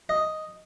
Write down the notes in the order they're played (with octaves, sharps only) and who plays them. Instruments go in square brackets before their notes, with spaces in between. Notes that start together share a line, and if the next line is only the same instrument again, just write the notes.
[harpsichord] D#5